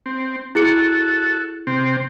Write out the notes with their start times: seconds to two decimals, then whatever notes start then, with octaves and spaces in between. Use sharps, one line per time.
0.06 C4
0.55 E4 F#4 G#4 A4 C#7
1.67 C3 C4